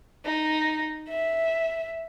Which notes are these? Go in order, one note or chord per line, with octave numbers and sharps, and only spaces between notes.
D#4
E5